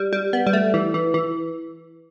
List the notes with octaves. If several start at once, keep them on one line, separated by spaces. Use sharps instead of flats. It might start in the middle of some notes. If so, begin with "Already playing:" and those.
Already playing: G3
G3
B3
G3
A3
E3
E3
E3